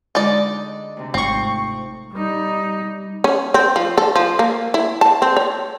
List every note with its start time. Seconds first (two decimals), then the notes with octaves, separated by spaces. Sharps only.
0.15 D3 G#3 D#4 D5 D6
0.97 D2 C3 C4
1.14 G#1 A3 C4 D#4 F4 C#6
2.12 G3 D#4
3.24 C#4
3.54 C4
3.76 F3
3.98 A4
4.16 F3
4.39 A#3
4.74 E4
5.01 A5
5.22 C4
5.37 C#5